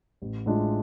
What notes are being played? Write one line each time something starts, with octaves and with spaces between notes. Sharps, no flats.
A1
A2 G#3 D4 F4